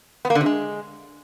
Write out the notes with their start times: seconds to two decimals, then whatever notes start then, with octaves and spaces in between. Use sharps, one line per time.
0.25 B3
0.30 A#3
0.35 D3
0.41 C3
0.46 G#3